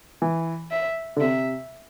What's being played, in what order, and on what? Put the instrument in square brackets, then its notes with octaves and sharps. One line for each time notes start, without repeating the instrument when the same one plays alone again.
[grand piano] E3
[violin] E5
[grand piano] D3
[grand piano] C3 [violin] E5